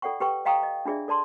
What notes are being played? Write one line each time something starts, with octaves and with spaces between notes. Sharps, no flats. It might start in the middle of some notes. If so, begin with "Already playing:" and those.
F4 A4 D5 F#5 G5 C#6
G4 A4 B4 G5 C#6
D#5 F5 G5 A#5 C#6 D#6
D#5
D4 F4 G#4 D5 E5
A4 D5 A5 C6